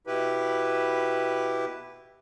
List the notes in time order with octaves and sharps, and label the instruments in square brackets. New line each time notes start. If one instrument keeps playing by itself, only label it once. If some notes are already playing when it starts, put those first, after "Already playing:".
[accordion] B2 E4 G4 B4